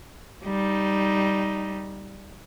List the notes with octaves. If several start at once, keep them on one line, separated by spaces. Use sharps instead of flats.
G3 D#4